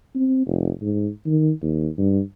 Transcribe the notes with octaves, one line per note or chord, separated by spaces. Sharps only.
C4
F1
G#2
D#3
D#2
G2